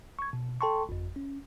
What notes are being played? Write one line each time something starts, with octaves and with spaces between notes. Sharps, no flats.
C#6 G#6
B2
A4 G5 A5 C6 C#6
G1 F2
C#4